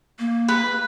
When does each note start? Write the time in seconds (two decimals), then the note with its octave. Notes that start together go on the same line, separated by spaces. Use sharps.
0.19 A#3
0.48 B4